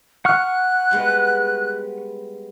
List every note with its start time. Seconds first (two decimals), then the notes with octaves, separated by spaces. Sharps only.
0.25 F#5 C#6 F6 F#6
0.91 G3 G#3 B3